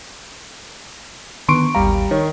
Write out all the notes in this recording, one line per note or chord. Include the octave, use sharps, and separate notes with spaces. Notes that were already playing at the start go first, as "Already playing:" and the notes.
D3 D#3 B3 C6 C#6 D7
A1 D#2 G3 F5 A#5
D#3 C#5